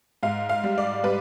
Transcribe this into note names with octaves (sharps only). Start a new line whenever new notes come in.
G#2 F5
F5
G3
D5
G3 B4